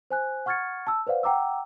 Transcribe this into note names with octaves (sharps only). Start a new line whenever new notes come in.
C5 G#5 F#6
F#5 C#6 F6 G#6 A6 C#7
A5 E6
B4 C5 D5 F5 F#5
F#5 G5 A#5 D6 E6